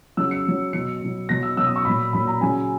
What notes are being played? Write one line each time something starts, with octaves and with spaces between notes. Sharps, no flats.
C#3 F#3 E6
C#7
C#3 F#3
B2 F#3 C#7
B2 F#3
B2 F#3 A#6
E6
B2 F#3 E6
D#6
C#6
A#2 F#3 B5
A#2 F#3 B5
A#5
C#3 F#3 G#5